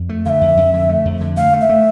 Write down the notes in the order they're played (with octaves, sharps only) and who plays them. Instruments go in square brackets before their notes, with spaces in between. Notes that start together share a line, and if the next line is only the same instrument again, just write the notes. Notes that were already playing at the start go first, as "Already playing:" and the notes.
Already playing: [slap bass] F2
A3
[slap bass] D3 [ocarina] E5 F5
[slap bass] F2
F2
D3
A3
F2
D3
[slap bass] A3 [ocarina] F5
[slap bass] A3
[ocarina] E5
[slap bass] A3